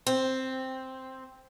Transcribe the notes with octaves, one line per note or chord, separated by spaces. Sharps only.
C4